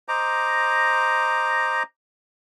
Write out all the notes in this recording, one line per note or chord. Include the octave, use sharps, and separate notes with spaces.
C5 D#5 A#5 D6